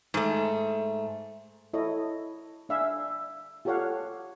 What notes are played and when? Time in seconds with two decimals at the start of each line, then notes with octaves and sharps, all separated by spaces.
0.14 G#2 A3
1.73 E4 A4 C#5 D#5
2.69 D4 E5 F5 G#5
3.65 F4 G4 A4 C#5 F5 F#5